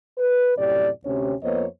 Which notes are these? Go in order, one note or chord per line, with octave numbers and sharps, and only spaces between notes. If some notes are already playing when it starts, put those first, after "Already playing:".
B4
F#2 A2 C3 G4 D5
D2 C3 C#4 G4 C#5
F2 A#3 B3 C5 C#5 D#5